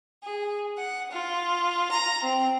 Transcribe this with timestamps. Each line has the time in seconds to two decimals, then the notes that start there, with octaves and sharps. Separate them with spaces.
0.22 G#4
0.76 F#5
1.09 F4
1.90 A#5
2.22 C4